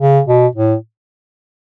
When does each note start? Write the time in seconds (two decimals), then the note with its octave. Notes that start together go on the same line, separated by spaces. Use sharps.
0.01 C#3
0.28 B2
0.56 A2